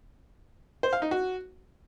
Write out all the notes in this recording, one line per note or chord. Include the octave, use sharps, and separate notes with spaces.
C5
F5
D#4
F#4